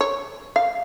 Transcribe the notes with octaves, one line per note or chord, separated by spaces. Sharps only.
C#5
F5